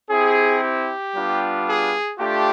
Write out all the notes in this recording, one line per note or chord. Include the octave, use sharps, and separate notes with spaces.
C4 E4 G4 G#4
G4
G3 B3 D4 F4
G#4
A3 D4 F4 G4